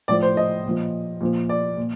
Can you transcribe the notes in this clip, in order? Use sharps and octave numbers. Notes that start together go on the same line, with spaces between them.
A2 F3 D5
C5
D#5
A#2 F3
A#2 F3
D5
A#2